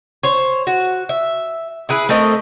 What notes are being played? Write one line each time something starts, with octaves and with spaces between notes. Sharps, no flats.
C5 C#5
F#4
E5
E4 G#4 B4
A3 C4 A#4 D#5